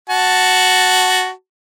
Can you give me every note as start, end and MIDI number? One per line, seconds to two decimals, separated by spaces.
0.09 1.31 66
0.09 1.31 81